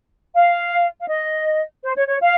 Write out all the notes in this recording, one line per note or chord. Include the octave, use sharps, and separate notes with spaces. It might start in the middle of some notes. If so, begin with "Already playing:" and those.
F5
F5
D#5
C5
C#5
C#5
F5